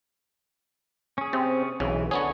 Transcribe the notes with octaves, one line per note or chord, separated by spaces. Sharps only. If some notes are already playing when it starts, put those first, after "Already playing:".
C#4 G#4
C3 C4
B1 C#3 E3
D3 B3 C#4 G#4 C#5